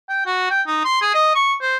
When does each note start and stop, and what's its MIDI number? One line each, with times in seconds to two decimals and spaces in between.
0.09 0.24 79
0.26 0.45 66
0.50 0.62 79
0.67 0.81 63
0.85 1.00 84
1.01 1.12 68
1.14 1.31 75
1.35 1.54 85
1.61 1.77 72